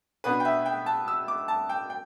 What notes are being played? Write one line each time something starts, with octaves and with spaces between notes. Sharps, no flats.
B2 B3 D4 B4
G5
E5
G5
A5
E6
D6
A5
G5
G5